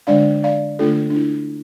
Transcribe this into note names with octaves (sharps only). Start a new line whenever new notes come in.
D3 G#3 D4 D5 F5
D5 F5
D3 A3 D4 F4 A4
D4
E4